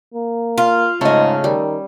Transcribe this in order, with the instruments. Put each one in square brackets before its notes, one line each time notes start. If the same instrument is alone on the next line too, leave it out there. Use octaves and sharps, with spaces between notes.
[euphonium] A#3
[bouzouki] F4
[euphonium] G#2 [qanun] C#3 C#4 [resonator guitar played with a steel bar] A3 D#5
[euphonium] D#3 [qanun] G3